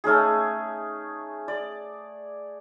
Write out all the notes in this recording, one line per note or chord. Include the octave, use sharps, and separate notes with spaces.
A3 C#4 D#4 G#4
D5